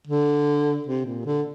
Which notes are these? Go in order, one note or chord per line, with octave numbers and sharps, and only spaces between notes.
D3
C3
A#2
D3